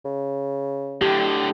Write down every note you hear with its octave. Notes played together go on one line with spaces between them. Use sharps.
C#3
A2 D3 G4